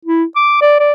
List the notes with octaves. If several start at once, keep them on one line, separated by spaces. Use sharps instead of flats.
E4
D6
D5
D5